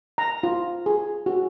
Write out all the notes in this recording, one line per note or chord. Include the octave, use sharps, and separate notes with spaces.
A#5
F4
G#4
F#4